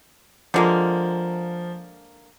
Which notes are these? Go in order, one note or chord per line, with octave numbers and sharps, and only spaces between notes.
D3 F3 G#3 A#3